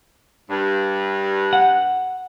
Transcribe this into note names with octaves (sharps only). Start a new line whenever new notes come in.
G2
F#5